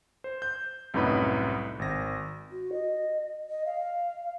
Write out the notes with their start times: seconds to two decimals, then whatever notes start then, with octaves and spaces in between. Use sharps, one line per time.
0.24 C5
0.42 G6
0.94 C2 F#2 A2 D#4 B4 B5
1.79 G#1 A#6
2.50 F#4
2.72 D#5
3.50 D#5
3.66 F5